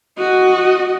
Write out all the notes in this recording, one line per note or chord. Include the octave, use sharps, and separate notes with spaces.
F#4 D#5